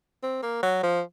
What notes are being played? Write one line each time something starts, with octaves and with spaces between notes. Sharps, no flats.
C4
A#3
F#3
F3